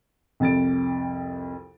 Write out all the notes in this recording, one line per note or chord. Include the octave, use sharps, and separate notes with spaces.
C2 F2 A6 D7